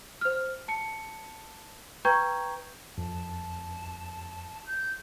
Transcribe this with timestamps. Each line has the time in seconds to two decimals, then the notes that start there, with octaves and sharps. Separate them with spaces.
0.21 C5 F6
0.68 A5 C#7
2.05 B4 G5 A#5 C#6 G6 G#6
2.98 F2 A5
4.66 G6